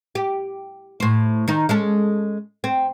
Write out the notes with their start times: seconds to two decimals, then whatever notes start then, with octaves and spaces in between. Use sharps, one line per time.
0.15 G4
1.00 A2 C5
1.48 D#3 D#4
1.69 G#3 C#4 A4
2.64 C4